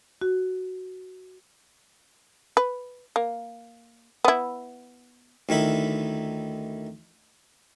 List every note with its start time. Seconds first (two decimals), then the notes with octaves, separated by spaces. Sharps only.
0.21 F#4
2.57 B4
3.16 A#3
4.25 B3 E4
5.49 D2 D#3 E4 B5